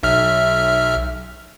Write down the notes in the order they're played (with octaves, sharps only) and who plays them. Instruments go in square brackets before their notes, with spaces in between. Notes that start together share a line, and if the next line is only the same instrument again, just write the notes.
[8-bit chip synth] B1 E5 F6